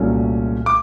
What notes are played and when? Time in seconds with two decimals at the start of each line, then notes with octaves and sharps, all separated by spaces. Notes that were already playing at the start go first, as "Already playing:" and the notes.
Already playing: C2 A#2 F#3 A3 C#4
0.66 D6